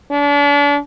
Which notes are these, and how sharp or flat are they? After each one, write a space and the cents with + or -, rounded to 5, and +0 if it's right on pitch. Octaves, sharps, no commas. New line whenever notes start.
D4 -35